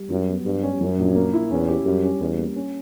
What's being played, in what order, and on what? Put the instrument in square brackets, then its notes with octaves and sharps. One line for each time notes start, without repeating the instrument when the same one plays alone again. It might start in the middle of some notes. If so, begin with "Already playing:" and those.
Already playing: [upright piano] G3
[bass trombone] F#2 [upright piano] F#3
[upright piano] B3
[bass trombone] G2 [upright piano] G3
[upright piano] C#4
[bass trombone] F#2 [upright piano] F#3
[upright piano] A#1
A#3
E4
[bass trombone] E2 [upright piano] C#4
[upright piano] G4
[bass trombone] F#2 [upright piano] G3
[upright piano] C#4
[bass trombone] E2 [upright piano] G3
[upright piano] A#3
C#4